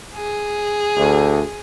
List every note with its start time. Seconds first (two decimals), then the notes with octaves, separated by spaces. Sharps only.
0.15 G#4
0.97 D2